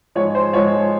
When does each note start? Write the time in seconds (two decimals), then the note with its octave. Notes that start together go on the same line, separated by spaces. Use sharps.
0.16 G#2 F3 G#3 C#5
0.35 C5
0.53 G#2 F3 G#3 C#5